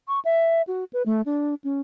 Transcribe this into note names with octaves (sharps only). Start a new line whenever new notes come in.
C#6
E5
F#4
B4
A3
D4
C#4